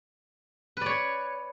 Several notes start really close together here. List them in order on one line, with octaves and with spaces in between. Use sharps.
B4 D5 C#5